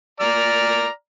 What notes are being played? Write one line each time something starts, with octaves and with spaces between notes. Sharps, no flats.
D5 A#5 F6